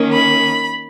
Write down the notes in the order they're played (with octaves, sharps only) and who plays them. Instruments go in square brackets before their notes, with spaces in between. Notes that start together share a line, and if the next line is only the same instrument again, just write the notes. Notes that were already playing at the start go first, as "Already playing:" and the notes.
Already playing: [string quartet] D#3 A#3 C#4
B5